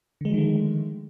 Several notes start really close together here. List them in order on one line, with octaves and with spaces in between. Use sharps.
D3 G#3 F3 D#3 A3